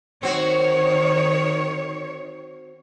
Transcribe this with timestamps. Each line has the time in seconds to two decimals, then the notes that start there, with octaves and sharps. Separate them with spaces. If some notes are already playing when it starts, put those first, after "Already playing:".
0.23 D#3 C4 F#4 C#5